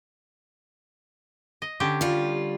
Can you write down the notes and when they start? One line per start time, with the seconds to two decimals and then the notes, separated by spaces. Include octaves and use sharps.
1.62 D#5
1.80 D3 C#4 G4
2.01 G3 F4